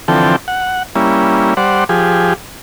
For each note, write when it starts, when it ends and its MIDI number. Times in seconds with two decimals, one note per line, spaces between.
0.08 0.36 50
0.08 0.36 52
0.08 0.36 53
0.08 0.36 60
0.08 0.36 69
0.08 0.36 79
0.48 0.83 78
0.95 1.54 55
0.95 1.54 58
0.95 1.54 61
0.95 1.54 64
1.57 1.84 55
1.57 1.84 72
1.57 1.84 74
1.57 1.84 78
1.89 2.33 53
1.89 2.33 67
1.89 2.33 68